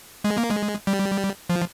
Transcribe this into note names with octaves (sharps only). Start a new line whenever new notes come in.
G#3
A#3
G#3
G3
F3